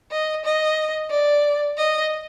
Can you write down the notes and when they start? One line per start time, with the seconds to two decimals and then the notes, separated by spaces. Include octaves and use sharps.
0.11 D#5
0.45 D#5
1.10 D5
1.77 D#5